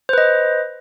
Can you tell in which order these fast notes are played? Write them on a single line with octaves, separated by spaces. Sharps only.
C5 B4 D#5